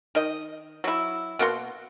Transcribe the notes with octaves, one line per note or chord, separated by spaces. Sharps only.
D#3 D#5
F#3 E4
B2 A#3 F#4 C6